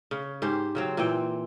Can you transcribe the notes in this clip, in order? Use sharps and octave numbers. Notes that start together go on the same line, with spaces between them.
C#3
G#2 G4 C5
C#3 F#3 C4
A#2 E3 C4 G5